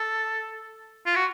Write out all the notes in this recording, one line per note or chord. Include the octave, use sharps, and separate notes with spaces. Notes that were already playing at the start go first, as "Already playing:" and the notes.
Already playing: A4
F4
F#4